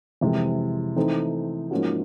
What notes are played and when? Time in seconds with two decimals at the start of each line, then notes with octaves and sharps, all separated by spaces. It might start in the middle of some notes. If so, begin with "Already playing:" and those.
0.21 F2 C3 E3 G#3
0.96 E3 A3 C4 D#4
1.71 G#2 F3 A#3 C#4 F#4